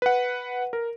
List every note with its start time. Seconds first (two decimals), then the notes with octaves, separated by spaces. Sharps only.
0.02 B4 F#5
0.73 A#4